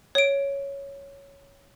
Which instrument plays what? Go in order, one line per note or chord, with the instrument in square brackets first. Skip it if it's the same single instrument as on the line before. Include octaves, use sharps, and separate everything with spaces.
[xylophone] C#5 D7